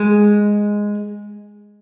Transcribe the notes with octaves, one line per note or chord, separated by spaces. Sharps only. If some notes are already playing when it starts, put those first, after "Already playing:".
Already playing: G#3